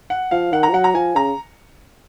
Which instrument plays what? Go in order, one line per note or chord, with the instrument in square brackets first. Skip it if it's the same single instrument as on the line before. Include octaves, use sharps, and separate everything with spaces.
[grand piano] F#5
[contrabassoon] F3 [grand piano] F5
[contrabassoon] D#3 [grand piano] F#5
[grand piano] A#5
[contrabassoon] F3
[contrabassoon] F#3 [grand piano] F#5
[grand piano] A#5
[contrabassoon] F3 [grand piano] G#5
[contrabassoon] C#3 [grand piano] A#5